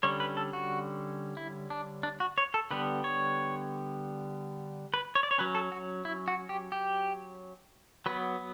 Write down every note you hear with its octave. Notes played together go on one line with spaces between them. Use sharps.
D3 G3 C#4 C#5
B4
A4
F#4
E4
D4
D4
F#4
C#5
A4
D3 G3 B3 B4
C#5
B4
C#5
D5
C#5
F#3 C#4 B4
A4
F#4
E4
F#4
G4
G4
F#3 B3 B4